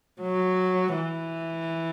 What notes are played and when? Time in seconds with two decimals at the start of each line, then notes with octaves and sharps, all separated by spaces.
0.21 F#3
0.96 E3